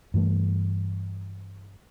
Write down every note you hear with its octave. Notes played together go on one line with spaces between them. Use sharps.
G2 E3 A3